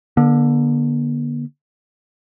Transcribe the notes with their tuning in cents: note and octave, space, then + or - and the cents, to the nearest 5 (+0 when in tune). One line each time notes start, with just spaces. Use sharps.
D3 +5 A#3 +45